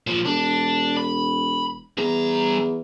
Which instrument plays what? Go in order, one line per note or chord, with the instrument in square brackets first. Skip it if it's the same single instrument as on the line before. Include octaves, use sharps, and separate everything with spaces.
[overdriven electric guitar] A#2 F3
[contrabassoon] E1 [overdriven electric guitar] D4
[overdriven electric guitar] B5
[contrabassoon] E2 [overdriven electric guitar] G2 A#5